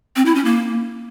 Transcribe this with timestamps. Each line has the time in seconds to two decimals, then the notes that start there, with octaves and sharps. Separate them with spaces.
0.16 C4
0.26 E4
0.35 C#4
0.45 A#3